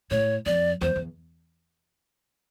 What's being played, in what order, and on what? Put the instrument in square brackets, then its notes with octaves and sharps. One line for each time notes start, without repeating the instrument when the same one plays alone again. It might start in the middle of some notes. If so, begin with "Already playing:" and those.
[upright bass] A2 [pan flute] C#5
[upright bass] F2 [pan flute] D5
[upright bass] E2 [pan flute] C5
[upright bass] E2